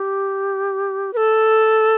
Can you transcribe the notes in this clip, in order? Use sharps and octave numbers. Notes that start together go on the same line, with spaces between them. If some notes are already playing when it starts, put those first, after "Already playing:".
Already playing: G4
B4
A4